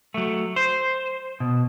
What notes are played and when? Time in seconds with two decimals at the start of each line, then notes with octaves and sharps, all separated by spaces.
0.14 F#3 A3
0.56 C5
1.40 B2